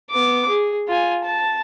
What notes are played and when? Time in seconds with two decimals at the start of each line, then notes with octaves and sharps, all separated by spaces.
0.10 B3 D6
0.48 G#4
0.88 F4 G#5
1.24 A5